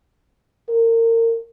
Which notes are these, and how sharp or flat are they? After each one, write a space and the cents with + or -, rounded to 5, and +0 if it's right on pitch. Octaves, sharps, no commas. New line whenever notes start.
A#4 -30